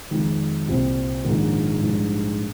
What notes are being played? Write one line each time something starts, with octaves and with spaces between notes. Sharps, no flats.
F2 D#3 G#3
C2 A#2 G3 C4
A#1 G#2 D#3 A#3
A#1 G#2 G3